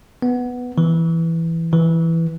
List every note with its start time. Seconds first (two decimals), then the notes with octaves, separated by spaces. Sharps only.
0.22 B3
0.78 E3
1.73 E3